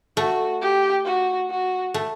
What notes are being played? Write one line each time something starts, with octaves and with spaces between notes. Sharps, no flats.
A3 F#4
G4
F#4
F#4
A3